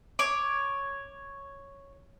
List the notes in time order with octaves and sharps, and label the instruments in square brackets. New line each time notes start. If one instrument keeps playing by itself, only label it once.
[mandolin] C#5 D6